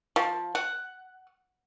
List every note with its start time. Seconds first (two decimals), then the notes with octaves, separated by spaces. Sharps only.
0.16 F3
0.55 F#5